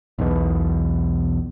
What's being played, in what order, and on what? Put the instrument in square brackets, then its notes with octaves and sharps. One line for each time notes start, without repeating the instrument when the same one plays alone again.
[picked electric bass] B1 E2 B2